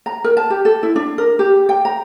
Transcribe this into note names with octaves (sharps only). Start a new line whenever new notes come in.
A#5
A#4
A5
G4
A4
E4
D4
A#4
G4
G5
A#5